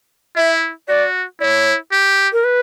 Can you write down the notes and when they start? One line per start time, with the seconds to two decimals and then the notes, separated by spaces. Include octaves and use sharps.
0.36 E4 E5
0.88 F#4 D5
1.40 E4 C#5 D5
1.92 G4
2.33 A#4
2.44 B4